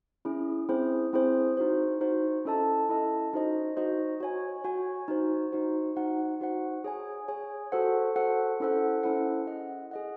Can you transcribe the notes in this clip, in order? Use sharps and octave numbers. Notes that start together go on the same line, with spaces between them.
C#4 E4 G#4
C4 E4 G#4 C5
C4 E4 G#4 C5
D#4 F#4 C5
D#4 F#4 C5
C#4 E4 A4 D#5 A5
C#4 E4 A4 D#5 A5
D#4 F#4 C5 D#5
D#4 F#4 C5 D#5
F#4 C#5 G#5
F#4 C#5 G#5
D#4 F#4 C5
D#4 F#4 C5
D#4 F#4 C5 F#5
D#4 F#4 C5 F#5
G#4 C#5 G#5
G#4 C#5 G#5
F#4 A4 C5 F#5
F#4 A4 C5 F#5
C#4 E4 A4 C5 F#5
C#4 E4 A4 C5 F#5
G#4 D#5 F#5
G#4 D#5 F#5